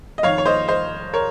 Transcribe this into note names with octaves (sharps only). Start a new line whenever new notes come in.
D#5
F2 D#3 C#5 F5
C#5
C5 D#5
C5 D#5
A#4 C#5